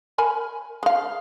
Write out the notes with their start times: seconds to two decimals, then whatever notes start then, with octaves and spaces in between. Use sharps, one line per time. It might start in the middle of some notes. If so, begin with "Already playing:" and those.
0.18 A#4 G#5 B5
0.83 G#3 F5